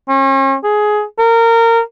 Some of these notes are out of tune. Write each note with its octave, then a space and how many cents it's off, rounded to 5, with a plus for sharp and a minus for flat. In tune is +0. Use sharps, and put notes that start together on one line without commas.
C#4 -40
G#4 +15
A#4 -20